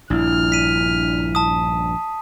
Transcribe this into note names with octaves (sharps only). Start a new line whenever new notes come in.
A#1 G2 D4 E4 F6
B6 D#7
A5 D#6